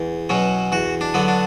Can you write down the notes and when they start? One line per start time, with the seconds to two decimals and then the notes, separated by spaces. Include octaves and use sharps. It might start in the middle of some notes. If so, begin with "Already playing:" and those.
Already playing: E2
0.29 B2 F#3 C#4
0.72 E2 F#4
1.01 D4
1.14 D3 F#3 B3
1.28 D4